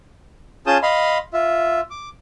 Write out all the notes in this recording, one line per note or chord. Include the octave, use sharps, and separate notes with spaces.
C#4 F4 G#4 A5 D#6 G6
D#5 F5 B5 C6
F4 E5
D6